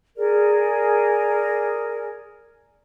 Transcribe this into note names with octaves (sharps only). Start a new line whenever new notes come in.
G#4 A#4 D5